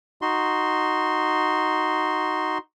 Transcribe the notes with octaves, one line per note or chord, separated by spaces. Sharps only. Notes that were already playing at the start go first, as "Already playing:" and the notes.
D#4 F#4 C6